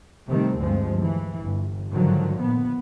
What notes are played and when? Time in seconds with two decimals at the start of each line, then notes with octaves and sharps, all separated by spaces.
0.28 C3 D#3 G3 A3 C4
0.59 D2 G2 F3 G#3
0.99 E3
1.41 G1
1.89 G#2 D3 D#3 F3 F#3
2.40 A#2 B3